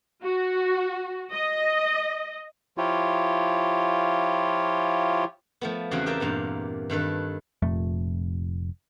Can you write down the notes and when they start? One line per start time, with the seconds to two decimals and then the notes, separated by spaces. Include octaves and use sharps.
0.23 F#4
1.32 D#5
2.78 F3 E4 F4 G4 C#5
5.61 F3 A3 B3
5.91 E2 C#3 C4 F#4 G#4
6.06 G4 G#4 A#4 E5 G5 A5
6.20 E2 G2 A#2 F5
6.90 G2 D#3 A4 B4
7.62 F1 F2 A#2 A3